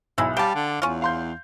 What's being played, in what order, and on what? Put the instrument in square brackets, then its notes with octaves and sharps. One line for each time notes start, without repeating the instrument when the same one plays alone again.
[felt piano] B1 [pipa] G#3 E4
[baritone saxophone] G3 [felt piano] F5 D6 [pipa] G5 A5
[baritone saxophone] D3
[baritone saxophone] E2 [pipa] C#4 F4
[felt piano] F5 C6 G6